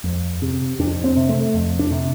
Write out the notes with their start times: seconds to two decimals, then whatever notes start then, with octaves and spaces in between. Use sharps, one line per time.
0.04 F2
0.42 C3
0.79 F2 D4
1.04 C4
1.17 C3
1.29 A3
1.54 F2
1.79 D4
1.92 C3